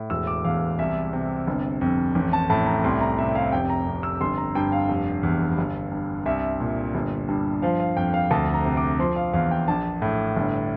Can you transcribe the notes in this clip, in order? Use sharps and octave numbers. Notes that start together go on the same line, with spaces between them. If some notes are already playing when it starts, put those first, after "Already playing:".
Already playing: A2
E1 E6
D6
E2 F5
C2 E5
C3
G1
F2
A1
A5
A2 A5
A#5
C2 C6
A#5
C3 E5
F5
F1 G5
A#5
F2
E6
G1 C6
A#5
G2 G5
F5
F1
E2
G1
G2
C2 E5
A#2
G1
G2
F3 F5
F5
F2 G5
F5
D2 A5
A#5
C3
D6
F3 C6
F5
E2 F5
G5
A#1 A5
A2
G1